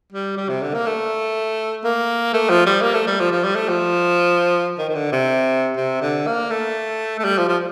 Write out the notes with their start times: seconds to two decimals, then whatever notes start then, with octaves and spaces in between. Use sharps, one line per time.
0.12 G3
0.37 G3
0.49 C3
0.62 D3
0.74 A#3
0.86 A3
1.84 A#3
2.33 A3
2.49 F3
2.66 G3
2.82 A#3
2.94 A3
3.07 G3
3.20 F3
3.31 F3
3.44 G3
3.56 A3
3.69 F3
4.78 D#3
4.89 D#3
4.95 D3
5.12 C3
5.77 C3
6.02 D3
6.27 A#3
6.50 A3
7.20 A3
7.25 G3
7.38 F3
7.49 F3